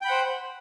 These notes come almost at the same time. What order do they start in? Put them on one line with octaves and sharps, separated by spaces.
G5 B5 F#5 C5